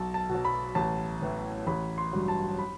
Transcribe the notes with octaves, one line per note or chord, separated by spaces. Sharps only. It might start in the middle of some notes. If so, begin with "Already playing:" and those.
Already playing: B1 A5
A5
B2
F#3
B5
A1 A5
A2 E3
A1 B5
C6
G2 F#3
A5
B5